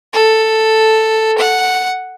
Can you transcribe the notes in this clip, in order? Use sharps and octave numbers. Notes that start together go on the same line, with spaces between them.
A4
F#5